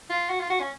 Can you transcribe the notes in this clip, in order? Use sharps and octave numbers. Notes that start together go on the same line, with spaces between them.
F4
F#4
F4
F#4
C#4